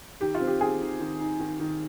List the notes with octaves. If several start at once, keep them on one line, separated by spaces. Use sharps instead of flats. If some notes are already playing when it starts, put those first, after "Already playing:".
D#3 G4
F4
C4
G4
D#3 G#4
D#3
D#3
D#4
D#3
D#3